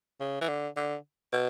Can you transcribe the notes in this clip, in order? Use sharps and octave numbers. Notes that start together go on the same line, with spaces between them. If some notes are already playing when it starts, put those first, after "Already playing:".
C#3
E3
D3
D3
B2